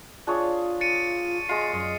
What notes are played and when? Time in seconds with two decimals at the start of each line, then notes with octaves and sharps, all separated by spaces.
0.27 D4 F4 G#4 C#5
0.81 A6 C#7 D#7
1.49 G#3 F4 C7
1.73 F#2 D#5